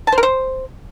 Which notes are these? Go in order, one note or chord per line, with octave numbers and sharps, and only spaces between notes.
A5
C5
A#4
C5